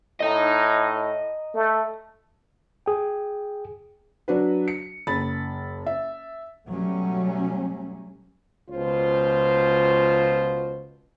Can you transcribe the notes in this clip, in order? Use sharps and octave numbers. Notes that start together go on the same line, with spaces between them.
A2 D#5 A#5
A3
G#4 G5
F#3 D4 F#4 B4
C#7
F#1 B5 A6
E5
B2 F#3 G3 A3 C#4
C#2 B2 F4 C5